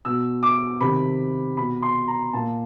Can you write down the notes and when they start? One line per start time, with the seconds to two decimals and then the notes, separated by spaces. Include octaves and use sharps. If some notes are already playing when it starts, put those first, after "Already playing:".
0.05 B2 E6
0.43 D6
0.81 C3 D#3 B5
1.57 B2 B5
1.82 C6
2.08 A#5
2.33 A#2 A5